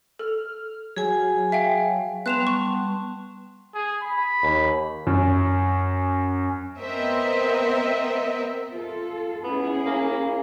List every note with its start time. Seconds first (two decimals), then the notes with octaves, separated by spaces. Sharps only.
0.19 A4 F6
0.97 F#3 G#4 G#5
1.52 E5 F5 G5
2.26 G3 B3 A5 C6 F#6 E7 F7
2.47 C#6
3.74 G#4
4.03 B5
4.42 D#2
5.07 F#2
6.80 B3 C4 A#4 D#5 E5
8.71 F4 A4
9.44 B3 C#4 E4 G#4
9.86 A#3